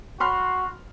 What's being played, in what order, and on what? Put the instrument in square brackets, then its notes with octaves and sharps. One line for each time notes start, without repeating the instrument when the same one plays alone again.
[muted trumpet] F#4 [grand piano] B5 C6 F6